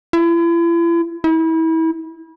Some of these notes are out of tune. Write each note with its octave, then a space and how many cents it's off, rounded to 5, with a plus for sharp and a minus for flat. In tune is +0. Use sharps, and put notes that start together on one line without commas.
E4 +40
E4 -30